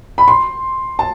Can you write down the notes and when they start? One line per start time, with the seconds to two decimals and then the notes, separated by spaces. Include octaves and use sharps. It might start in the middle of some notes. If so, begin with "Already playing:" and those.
0.18 B5
0.28 C6
0.99 A5